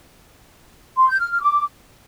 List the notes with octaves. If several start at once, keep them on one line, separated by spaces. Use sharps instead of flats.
C6
G6
F6
F6
D6